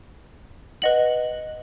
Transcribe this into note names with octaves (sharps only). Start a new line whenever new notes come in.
B4 D#5 F#5 F#7